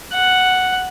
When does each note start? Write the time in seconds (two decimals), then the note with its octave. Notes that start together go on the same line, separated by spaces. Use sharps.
0.14 F#5